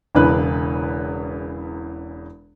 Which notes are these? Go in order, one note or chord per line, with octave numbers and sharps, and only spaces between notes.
E1 E2 C#3 E3 B4 F#6